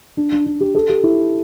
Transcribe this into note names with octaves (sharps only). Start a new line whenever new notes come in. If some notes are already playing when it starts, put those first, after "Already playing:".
D4
D4
D4
G4
A4
G4
E4